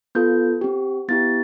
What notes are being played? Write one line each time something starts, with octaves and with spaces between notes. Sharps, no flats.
B3 F4 A4 G6
C4 G4
B3 E4 G4 A6